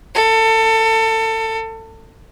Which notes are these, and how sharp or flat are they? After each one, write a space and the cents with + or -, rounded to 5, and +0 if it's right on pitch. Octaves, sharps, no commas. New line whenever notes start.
A4 +25